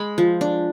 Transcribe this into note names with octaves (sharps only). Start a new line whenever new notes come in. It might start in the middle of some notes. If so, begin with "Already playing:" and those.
Already playing: G#3 B5
F3
D4